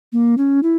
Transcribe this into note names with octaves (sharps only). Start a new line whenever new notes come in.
A#3
C#4
E4